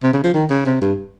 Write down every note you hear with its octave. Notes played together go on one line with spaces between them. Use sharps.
C3
C#3
F3
D#3
C#3
C3
G2